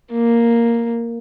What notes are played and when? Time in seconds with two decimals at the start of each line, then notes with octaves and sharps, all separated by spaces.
0.12 A#3